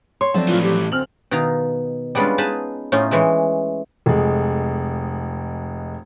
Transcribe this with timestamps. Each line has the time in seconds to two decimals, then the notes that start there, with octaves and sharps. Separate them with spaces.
0.21 C#5 C6
0.34 F3 F#3 A3 C4 D4
0.48 A2 E3 F4
0.63 G4
0.92 D1 C4 F6 F#7
1.31 B2 D#3 D#4 F5 A#5
2.15 G3 G#3 B3 C#4 D4 F4
2.38 D#4 G#4 B4 A5 B5
2.92 A2 C#4 D#4 F4
3.11 E3 G#3 A3
4.06 F1 G#3